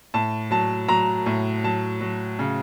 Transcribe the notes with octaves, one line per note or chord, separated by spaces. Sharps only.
A2 A5
F#3 A5
F#3 A#5
A2
F#3 A5
F#3
C#3